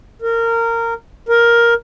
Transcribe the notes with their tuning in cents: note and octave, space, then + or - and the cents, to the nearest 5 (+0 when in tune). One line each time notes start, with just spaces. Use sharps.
A#4 -20
A#4 +10